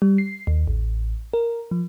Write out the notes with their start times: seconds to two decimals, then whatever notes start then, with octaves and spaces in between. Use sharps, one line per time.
0.02 G3
0.18 C7
0.47 D#2
0.67 A1
1.34 A#4
1.71 F3